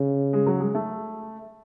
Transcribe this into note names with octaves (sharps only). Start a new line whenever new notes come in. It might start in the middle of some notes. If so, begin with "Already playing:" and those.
Already playing: C#3
G#3
F#3
G#3
A3